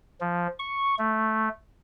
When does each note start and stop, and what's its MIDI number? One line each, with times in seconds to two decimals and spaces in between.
0.21 0.47 53
0.59 0.95 85
0.99 1.49 57